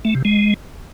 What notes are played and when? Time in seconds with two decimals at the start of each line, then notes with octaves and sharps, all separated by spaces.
0.05 A3
0.15 C3
0.25 G#3